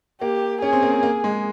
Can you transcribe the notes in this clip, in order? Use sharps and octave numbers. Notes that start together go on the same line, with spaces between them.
A#3 G4
C#4 G#4
C4
A#3
C4
A#3
G#3